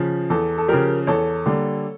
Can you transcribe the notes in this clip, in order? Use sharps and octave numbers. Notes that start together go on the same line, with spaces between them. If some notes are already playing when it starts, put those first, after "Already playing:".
Already playing: C#3 F3
E2 A4
A4
C#3 F3 G4 A#4
E2 A4 C#5
D3 G3 A#3